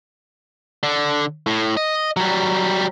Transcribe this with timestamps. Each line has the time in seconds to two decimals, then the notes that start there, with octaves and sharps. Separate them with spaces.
0.83 D3
1.47 A2
1.77 D#5
2.17 F#3 G3